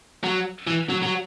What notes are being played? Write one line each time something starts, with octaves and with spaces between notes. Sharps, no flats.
F#3
E3
F#3
F#3